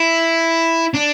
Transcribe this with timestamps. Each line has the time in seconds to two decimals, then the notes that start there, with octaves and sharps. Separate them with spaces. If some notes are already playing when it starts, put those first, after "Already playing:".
Already playing: E4
0.94 D4